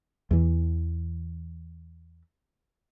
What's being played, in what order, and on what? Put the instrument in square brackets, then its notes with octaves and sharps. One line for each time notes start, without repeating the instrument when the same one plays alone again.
[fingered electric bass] E2 E3